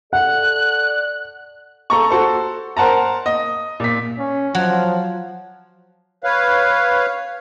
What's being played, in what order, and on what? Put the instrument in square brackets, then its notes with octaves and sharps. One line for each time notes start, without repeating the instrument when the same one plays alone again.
[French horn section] A4 D5 [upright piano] F#5 [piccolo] F#6
[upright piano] A4 A#5 C#6
F#4 A4 C5
A#4 C5 F#5 A5 A#5
D#5
A#2 B6
[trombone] C#4
[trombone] F3 [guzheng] F#3
[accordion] B4 C#5 F5